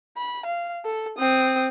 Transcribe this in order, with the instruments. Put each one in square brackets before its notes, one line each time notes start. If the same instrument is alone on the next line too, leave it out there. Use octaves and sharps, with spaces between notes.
[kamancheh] B5
F5
A4
C4 D#6